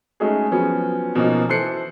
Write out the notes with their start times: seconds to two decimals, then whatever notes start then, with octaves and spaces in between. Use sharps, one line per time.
0.20 G#3 A3 C#4 D#4 F#4 G#4
0.51 F3 F#3 B3 C#4 F#4
1.15 B2 F3 A#3 C#4 D#4 F#4
1.49 E3 A4 C5 F#6 C7 C#7